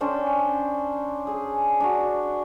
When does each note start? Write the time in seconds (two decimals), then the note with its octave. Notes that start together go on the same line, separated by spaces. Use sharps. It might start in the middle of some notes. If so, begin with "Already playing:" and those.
0.01 C#4 D4 C5 G5
1.27 G#4
1.80 D4 F#4